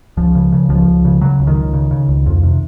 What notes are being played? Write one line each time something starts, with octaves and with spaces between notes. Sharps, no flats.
C#2 F3
C#3
C#3
C#2 F3
C#2
C#3
C#3 F#3
C#2
D#3
C#2
C#3
C#3
C#2
F2
C3